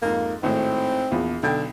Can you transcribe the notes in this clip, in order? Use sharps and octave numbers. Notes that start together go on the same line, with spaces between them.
F2 G#2 A#3
G#1 A2 C4
A#1 E2 F4
B1 D3 G5